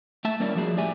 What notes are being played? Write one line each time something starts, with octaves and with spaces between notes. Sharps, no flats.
A3 E5 A5
G3 A#3 C#4 E4 D5
F3 F#4 G#4
A2 G4 D5 E5 G#5